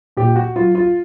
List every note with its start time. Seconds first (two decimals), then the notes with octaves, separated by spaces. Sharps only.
0.17 A#2 G4
0.36 F#4
0.56 F#3 F4
0.75 F4